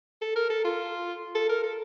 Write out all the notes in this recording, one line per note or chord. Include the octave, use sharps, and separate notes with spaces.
A4
A#4
A4
F4
A4
A#4
A4